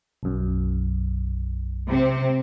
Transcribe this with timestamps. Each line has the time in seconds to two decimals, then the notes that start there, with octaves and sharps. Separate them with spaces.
0.23 B1 F#2
1.88 C3 C4